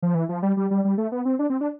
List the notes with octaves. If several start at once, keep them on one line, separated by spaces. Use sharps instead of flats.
F3
E3
F3
G3
G3
G3
G3
A3
B3
C4
D4
C4
D4